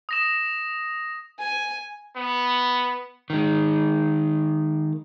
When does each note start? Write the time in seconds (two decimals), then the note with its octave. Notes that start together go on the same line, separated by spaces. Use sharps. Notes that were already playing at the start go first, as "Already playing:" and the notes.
0.09 D#6 A#6 E7
1.39 G#5
2.16 B3
3.30 D#3 G#3